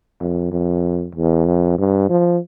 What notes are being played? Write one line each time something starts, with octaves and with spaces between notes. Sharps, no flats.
F2
F2
E2
F2
G2
F3